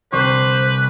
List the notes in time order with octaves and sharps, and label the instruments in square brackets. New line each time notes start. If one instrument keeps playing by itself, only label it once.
[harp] C2 [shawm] B4 [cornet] C5 [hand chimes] C#6 D6